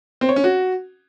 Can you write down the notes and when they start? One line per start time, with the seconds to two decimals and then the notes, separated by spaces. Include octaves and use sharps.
0.21 C4
0.29 C#5
0.36 C#4
0.44 F#4